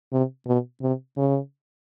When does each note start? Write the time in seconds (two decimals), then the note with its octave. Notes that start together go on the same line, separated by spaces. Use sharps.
0.12 C3
0.47 B2
0.82 C3
1.17 C#3